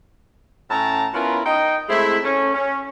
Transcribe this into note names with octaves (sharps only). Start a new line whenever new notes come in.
A2 C#4 E4 A5 A#5
B3 C#4 E4 F4 A#4
D#4 D#5 G5
G#3 A3 C4 E4
A3 C#4
C#4